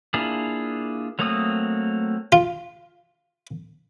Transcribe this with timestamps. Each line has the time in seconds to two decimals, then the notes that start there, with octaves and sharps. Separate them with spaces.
0.14 A#3 D4 E4 F4 G#4
1.19 F#3 A3 A#3 C4 D#6
2.32 F4